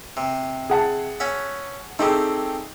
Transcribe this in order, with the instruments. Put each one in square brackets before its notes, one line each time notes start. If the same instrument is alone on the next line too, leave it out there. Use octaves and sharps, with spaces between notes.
[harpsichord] C3
[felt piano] G#4 F#5 A5
[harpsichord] C#4 F#4 E5
[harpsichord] A3 C4 G4 [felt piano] D#4 G#4